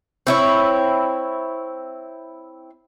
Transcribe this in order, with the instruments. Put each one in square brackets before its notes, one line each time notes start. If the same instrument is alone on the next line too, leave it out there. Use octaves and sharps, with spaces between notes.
[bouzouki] C4 E4 C#5